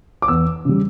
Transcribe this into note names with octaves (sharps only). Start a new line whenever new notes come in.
D6
E2 E6
C#3 G3